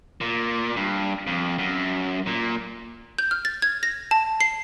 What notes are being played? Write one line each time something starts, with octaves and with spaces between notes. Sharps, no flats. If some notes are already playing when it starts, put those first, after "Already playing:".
A#2
G2
F2
F#2
A#2
G6
F6
A6
G#6
A#6
A5
C7